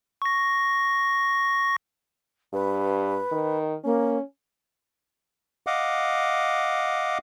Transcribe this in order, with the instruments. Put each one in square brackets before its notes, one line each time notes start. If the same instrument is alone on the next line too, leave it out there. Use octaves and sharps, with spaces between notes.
[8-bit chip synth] C#6 A#6
[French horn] G2 [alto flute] B4
[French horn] D#3
[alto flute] A#3 [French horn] C#4
[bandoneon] D#5 F5 F#5 D6